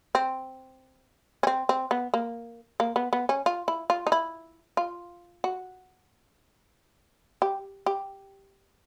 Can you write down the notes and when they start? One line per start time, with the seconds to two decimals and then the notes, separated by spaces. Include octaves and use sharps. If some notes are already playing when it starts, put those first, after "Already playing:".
0.15 C4
1.43 C#4
1.47 C4
1.69 C4
1.91 B3
2.14 A#3
2.80 A#3
2.96 B3
3.13 B3
3.29 C#4
3.46 F4
3.68 E4
3.90 F4
4.07 D#4
4.12 E4
4.77 F4
5.44 F#4
7.42 G4
7.86 G4